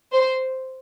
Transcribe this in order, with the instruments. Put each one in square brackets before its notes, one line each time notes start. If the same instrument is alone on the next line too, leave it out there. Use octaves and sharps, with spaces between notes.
[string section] C5